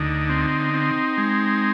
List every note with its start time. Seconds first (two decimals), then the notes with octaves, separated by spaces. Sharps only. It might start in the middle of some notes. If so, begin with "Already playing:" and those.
Already playing: D2 D3 D#4
0.29 C4
0.74 C4
1.18 G#3